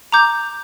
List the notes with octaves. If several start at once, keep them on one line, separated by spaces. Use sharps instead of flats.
A#5 D6 G6